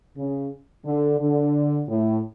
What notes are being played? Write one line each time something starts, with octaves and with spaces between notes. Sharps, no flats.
C#3
D3
D3
A2